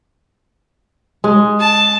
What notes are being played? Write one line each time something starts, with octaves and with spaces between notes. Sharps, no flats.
G#3
A5